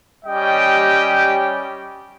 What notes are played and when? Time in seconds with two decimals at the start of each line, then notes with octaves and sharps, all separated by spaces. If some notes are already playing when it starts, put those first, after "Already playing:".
0.25 G3 C#4 G4 D#5 G5